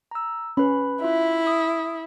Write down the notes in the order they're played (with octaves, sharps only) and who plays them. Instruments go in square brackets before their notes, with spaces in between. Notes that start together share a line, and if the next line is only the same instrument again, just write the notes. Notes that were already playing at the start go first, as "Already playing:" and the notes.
[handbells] A#5 E6
[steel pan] C#4 [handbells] B4 B5
[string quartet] E4 [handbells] F4 E5
[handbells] D#6